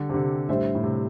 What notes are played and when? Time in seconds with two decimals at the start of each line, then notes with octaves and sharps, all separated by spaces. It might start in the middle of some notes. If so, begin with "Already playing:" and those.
Already playing: D3 G3
0.09 C3
0.14 D3
0.49 A2 G3 D4 C5 E5
0.75 A2
0.84 C3